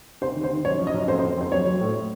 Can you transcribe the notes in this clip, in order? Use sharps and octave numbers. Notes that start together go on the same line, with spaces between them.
C3 C5
D#3
C5
D#3
F#2 C#5
F3
D#5
F#2
F2 C5
C5
F2
F2 C5
F#3 C#5
F#3
A2